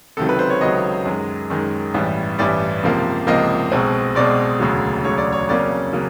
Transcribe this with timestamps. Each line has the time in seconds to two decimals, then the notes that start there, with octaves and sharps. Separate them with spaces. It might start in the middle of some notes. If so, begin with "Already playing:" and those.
0.17 C#2 C3 D#3 F#3 A4
0.29 B4
0.39 C5
0.50 C#5
0.61 C#2 C3 D#3 F#3 D#5
1.06 F#2 D#3 G#3
1.50 F#2 D#3 G#3
1.94 A1 G2 E3 G3
2.38 A1 G2 E3 G3 D5
2.83 C#2 C3 F3 A#3
3.27 C#2 C3 F3 A#3 D#5
3.72 B1 B2 G#3 C4
4.15 B1 B2 G#3 C4 D5
4.60 E1 D2 C#3 F#3
5.04 E1 D2 C#3 F#3 C#5
5.18 D5
5.33 C#5
5.48 F2 C#3 F#3 A#3 C#4 D5
5.93 C#3 F#3 A#3 C#4